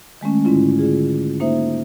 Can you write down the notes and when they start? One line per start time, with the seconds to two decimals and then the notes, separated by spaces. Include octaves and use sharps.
0.21 D#3 G#3 A3 C#4
0.44 G#2 D3 C#4 E4 F4
0.79 D3 F4 G#4
1.40 A#3 D#4 C5 E5